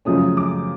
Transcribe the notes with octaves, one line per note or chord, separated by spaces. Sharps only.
F#2 C#3 F3 A3 C#4 D#6
D6